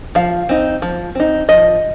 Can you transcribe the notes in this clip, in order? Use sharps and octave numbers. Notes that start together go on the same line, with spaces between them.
F3 F5
C4 D#4
F3
C4 D#4
F3 D#5